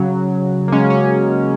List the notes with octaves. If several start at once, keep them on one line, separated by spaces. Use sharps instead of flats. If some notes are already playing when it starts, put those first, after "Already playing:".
Already playing: C#3 F#3
A#3
G#3 C#4
C#4